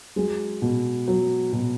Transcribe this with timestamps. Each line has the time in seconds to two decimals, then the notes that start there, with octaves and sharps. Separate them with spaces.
0.16 F#3 G#3 G#4
0.62 B2
1.08 F#3
1.53 B2